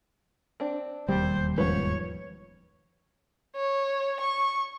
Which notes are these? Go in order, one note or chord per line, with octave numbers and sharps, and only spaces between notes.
C4 D4
E1 D#2 G3 C4 G4 C5
G#2 F3 B3 C#4 B4 C#5
C#5
C#6